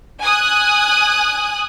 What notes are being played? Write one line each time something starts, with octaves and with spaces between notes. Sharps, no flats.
G#5 D#6 F#6